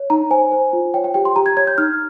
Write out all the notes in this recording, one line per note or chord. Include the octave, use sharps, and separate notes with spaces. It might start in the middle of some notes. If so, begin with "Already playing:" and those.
Already playing: C#5
D#4 A#5
C5 G#5
C5
F4
C#5 G5
G5
G4 G5
C6
G4 A#5
G#6
C#5 G#6
G6
D#4 F6